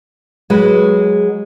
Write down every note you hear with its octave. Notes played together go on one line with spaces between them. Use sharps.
F#3 G#3 F#4 B4